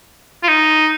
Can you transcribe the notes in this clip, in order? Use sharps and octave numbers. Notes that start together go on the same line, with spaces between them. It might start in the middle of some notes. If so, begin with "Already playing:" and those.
F4
D#4